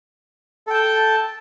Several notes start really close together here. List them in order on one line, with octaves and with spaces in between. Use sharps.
A4 G5 A5